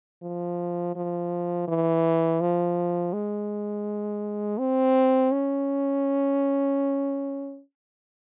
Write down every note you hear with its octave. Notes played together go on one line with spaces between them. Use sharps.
F3
F3
E3
F3
G#3
C4
C#4